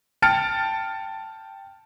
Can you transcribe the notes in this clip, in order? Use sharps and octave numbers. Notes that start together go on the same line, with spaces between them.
G5 A5 F6 A6 C#7 D7